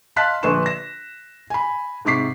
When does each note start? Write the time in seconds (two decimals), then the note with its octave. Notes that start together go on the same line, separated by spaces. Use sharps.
0.16 D#5 F5 A5 C6 F#6 B6
0.43 A#1 D3 B4 C6 C#6 E7
0.66 A#6 E7
1.50 G#5 B5
2.05 G#2 C3 C#6 D6 B6 C7